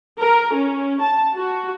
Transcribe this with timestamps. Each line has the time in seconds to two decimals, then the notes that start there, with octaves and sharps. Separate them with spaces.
0.19 A#4
0.54 C#4
1.01 A5
1.35 F#4